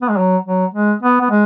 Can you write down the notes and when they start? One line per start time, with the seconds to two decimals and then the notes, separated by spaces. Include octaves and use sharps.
0.02 B3
0.09 G#3
0.17 F#3
0.45 F#3
0.74 G#3
1.02 B3
1.21 B3
1.30 G#3